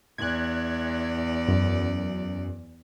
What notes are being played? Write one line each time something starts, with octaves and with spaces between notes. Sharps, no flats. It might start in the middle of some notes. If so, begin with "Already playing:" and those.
E2 D5 F#6 G#6
F#2